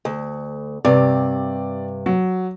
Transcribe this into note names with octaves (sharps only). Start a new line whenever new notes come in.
D2
G2 C3 D5
F#3